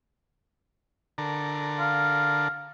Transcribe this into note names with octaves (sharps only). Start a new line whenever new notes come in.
D3 A4 A#4
F5